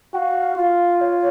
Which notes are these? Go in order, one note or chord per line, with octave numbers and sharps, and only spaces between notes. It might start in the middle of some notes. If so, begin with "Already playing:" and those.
F#4 F5 G5
F4 F5
C#5